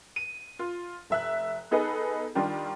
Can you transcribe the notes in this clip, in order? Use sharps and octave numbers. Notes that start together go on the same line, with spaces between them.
D#7
F4
F1 E5 F#6
B3 D#4 G#4 A4 B4 D#5
D#3 G3 D4 F4